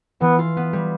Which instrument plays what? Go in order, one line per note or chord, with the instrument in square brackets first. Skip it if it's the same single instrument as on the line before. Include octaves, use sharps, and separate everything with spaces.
[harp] E3 [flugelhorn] B3
[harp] F4
B3
G3